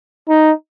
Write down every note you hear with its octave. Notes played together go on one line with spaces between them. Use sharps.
D#4